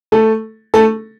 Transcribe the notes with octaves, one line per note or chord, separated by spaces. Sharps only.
A3 A4
A3 A4